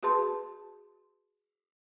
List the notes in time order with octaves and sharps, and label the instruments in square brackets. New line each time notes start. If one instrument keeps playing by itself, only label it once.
[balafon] F#4 G#4 B4 A5 C6